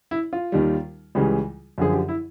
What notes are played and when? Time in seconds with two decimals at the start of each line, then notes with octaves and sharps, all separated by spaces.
0.11 E4
0.33 F4
0.52 D#2 D#3 G3
1.15 C#2 C#3 E3 G3
1.78 F#2 D3 F3 G#4
1.92 G4
2.09 E4